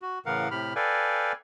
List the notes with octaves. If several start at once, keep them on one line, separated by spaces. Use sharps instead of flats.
F#4
A2 C#3 E3 A#4 F5 F#5
A2 C3 G4 B5 F6
A4 B4 D5 F5 G5 G#5